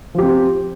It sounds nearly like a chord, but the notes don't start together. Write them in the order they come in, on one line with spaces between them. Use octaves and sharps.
F3 G4 C4